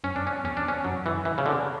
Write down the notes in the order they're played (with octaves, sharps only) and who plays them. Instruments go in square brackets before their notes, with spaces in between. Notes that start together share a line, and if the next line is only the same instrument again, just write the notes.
[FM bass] F#2 [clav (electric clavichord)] C#4
[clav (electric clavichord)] D4
C#4
[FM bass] E2 [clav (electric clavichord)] C#4
[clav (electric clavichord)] D4
C#4
[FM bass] F#2 [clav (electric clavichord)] F#3
[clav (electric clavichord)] E3
E3
C#3
D3